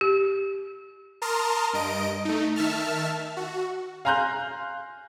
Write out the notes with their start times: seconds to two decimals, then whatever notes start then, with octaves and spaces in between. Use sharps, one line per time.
0.01 G4
1.22 A#4 A5 A#5 C6 D#6 F6
1.73 G2 D#5 D7
2.25 A3 D#4
2.56 D#3 E5 A5 F6
3.37 F#4
4.05 F5 G#5 A#5 C6 F#6 G6